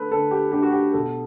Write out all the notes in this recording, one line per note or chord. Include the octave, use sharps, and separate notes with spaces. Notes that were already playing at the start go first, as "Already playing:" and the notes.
Already playing: D3 A3 D4 A4 B4
D3 A4
G4
A3 D4 G4
F#4
G4
B2 A4